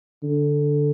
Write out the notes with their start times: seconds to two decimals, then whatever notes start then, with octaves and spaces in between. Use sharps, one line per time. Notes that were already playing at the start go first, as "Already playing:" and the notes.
0.23 D3